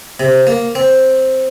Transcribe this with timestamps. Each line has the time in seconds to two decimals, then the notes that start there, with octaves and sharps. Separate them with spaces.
0.20 C3
0.47 A#3
0.75 C4